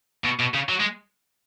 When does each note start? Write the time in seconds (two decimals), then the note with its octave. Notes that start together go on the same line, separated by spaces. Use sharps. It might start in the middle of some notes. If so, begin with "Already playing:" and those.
0.24 B2
0.39 B2
0.54 C#3
0.69 F#3
0.80 G#3